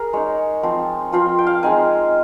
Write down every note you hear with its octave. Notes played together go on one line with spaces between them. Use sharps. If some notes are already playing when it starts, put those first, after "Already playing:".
Already playing: G#4 A#4
G#3 D#4 C#5
F3 C4 F4
F3 C4 F4 C5
G5
F5
G#3 C4 D#4 G#5